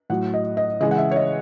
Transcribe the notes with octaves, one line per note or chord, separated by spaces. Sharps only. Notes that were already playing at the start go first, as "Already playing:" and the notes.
A2 F#3 F#5
D#5
D#5
C#3 E3 G#3 D#5
F#5
E5
C#5
D#5